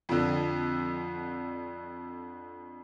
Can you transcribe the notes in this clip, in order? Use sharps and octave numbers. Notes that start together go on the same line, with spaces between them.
F2 D3